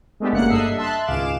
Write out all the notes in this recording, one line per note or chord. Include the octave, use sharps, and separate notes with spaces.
G#3 A3 B3 D4 G4
G1 C#3 A#3 F#5 F#6 C#7
G2 A4 D#5 E5 C7
E5 A5 C6 F#6
G#1 C#2 G#4 F5 D6 E7